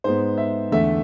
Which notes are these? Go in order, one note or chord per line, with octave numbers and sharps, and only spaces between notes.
G#2 G#3 B3 C5
E5
E2 D3 A3 E5